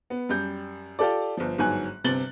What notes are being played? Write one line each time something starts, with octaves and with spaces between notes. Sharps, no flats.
B3
F#2 G3 G6
F4 G4 A4 D5
G1 F3
G1 G#2 F#3 G#5 F#6
G1 C3 A6 F#7 G7